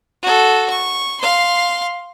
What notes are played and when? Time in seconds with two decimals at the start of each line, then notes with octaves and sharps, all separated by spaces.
0.23 F#4 A4
0.70 C#6
1.21 F5 C6